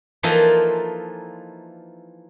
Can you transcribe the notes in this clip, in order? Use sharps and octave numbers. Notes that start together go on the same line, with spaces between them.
E3 F3 A#3 D#4 F4 A4